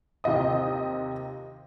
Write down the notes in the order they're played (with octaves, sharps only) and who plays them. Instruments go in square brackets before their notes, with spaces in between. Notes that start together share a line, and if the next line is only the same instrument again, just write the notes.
[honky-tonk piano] D#2 C3 F4 D#5 D#6